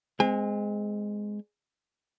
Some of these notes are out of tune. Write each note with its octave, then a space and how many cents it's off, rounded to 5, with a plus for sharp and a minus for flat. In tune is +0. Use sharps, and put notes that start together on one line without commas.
G#3 +0 C4 -25 G#5 -45